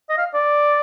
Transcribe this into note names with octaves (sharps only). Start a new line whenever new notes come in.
D#5
F5
D5